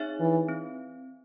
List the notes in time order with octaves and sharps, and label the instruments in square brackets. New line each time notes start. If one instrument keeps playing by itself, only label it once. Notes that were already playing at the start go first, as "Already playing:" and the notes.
Already playing: [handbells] C4 D#4 G#4 C#5 E5
[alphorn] E3
[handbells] C4